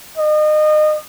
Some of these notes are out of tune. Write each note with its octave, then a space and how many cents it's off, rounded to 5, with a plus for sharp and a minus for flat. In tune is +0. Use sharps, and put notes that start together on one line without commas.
D#5 -30